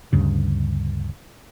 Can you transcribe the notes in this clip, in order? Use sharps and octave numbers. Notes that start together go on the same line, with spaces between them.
D2 G2 C#3